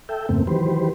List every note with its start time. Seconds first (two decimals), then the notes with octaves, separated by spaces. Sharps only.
0.09 A4 E5 G5
0.29 F2 G#2 C#3 A3 A#3 C4
0.47 D#3 E3 F#3 G4 B4 C5